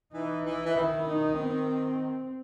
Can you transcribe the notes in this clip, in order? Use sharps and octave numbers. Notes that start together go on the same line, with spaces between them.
E3 D#4
E3
E3
D#3 E4
D#4
C4